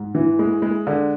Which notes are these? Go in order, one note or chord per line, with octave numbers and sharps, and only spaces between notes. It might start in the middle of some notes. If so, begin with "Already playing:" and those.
Already playing: G#2
E3
G#3
G#3
D3